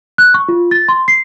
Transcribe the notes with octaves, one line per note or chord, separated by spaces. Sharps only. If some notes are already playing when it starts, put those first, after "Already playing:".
F#6
C#6
F4
A6
C6
C7